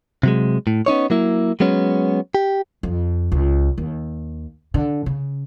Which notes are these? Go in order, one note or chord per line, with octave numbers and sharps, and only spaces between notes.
C3 F#3 G#3
A2
B3 C#4 D#4 C#5
F#3 A#3 E4
F#3 G#3 B3 C#4
G4
F2
C#2
D#2
D3
C#3